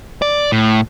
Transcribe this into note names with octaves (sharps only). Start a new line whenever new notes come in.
D5
A2